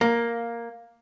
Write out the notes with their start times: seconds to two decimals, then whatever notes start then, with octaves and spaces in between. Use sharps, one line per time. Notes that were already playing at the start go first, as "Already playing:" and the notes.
0.01 A#3